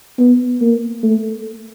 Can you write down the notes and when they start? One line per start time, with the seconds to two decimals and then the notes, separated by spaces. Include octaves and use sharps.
0.19 B3
0.61 A#3
1.03 A3